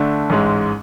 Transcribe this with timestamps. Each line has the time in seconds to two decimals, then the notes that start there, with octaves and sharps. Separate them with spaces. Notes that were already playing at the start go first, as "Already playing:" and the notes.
Already playing: D3 A3 D4
0.30 A1 G#2 G#3